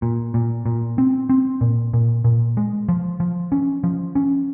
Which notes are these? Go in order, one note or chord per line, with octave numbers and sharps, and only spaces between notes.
A#2
A#2
A#2
C4
C4
A#2
A#2
A#2
G#3
F3
F3
C#4
F3
C#4